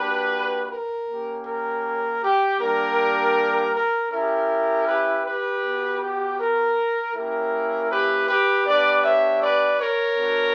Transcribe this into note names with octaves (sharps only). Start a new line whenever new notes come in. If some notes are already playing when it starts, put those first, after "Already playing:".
Already playing: A#3 D4 F#4 G4 B4
A#4
A#3 C#4 G4
A#4
G4
G3 A#3 D4 G4 A#4
A#4
C#4 E4 G4 A#4
G4 B4
G4 B4
B3 F#4
G4
A#4
A#3 C#4 E4 G4 A#4
G4 B4
G4 B4
B3 D4 G4 B4 D5
C#5 E5
B4 D5
A#4 C#5
B3 D4 F#4